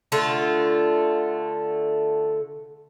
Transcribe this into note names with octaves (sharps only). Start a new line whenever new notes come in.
D3 A3 F4